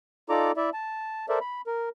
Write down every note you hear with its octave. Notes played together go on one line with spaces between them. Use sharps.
D#4 F4 A4 D5 A#5 D6
E4 D5 E5
A5
A4 A#4 C5 D5 E5
B5
A#4